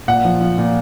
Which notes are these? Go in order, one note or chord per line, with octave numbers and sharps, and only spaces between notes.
A#2 F#5
F3
F3
A#2